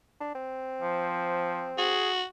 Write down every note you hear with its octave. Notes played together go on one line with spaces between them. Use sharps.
D4
C4
F3
F#4 G#4